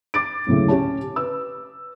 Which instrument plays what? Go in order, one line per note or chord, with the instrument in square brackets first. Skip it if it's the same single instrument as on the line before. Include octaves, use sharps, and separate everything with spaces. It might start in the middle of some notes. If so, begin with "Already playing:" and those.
[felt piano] D6 A6 D7
F#1 D2 A2 C#3
C#4 G4 C#5 A5
B4 E6